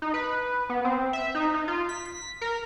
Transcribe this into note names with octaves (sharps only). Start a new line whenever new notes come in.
D#4
B4
B3
C4
E5
D#4
D#4
F4
B6
B6
A#4